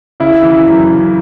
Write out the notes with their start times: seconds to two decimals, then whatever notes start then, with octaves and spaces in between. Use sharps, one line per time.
0.20 C#3 E4
0.43 E3
0.66 F#2
0.89 C#3